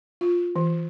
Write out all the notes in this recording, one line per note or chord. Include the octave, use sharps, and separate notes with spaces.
F4
E3